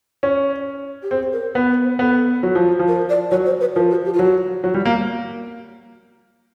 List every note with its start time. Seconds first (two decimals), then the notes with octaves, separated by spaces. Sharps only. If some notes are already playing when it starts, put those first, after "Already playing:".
0.23 C#4
1.03 G4
1.11 C4 G#4
1.33 A#4
1.55 B3 B4
1.70 B4
1.84 C5
1.99 B3 A4
2.43 F#3
2.55 F3
2.79 F3
2.88 A#4
3.09 D5
3.31 F#3 C#5
3.46 C5
3.61 B4
3.75 F3 A#4
3.90 F#4
4.05 G4
4.14 F4
4.19 F#3 F#4
4.64 F#3
4.74 G3
4.85 A#3